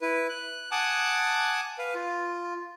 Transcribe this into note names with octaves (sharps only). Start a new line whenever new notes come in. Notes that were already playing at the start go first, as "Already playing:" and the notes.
E4 B4
F#6
F#5 G#5 A5 D6 D#6 F#6
B4 F5
F4